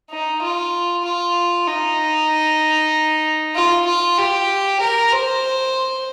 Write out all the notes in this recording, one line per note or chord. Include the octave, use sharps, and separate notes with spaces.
D#4
F4
F4
D#4
F4
F4
G4
A#4
C5